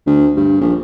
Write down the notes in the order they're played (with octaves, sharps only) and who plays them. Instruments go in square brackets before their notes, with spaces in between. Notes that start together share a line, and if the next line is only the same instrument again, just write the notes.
[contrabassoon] D2
G2
A#1